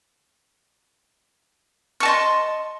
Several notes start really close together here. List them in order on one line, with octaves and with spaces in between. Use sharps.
C#6 A5 D#5 C6